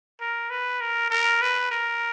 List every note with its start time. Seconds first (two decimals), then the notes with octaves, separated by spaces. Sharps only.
0.21 A#4
0.50 B4
0.81 A#4
1.10 A#4
1.42 B4
1.71 A#4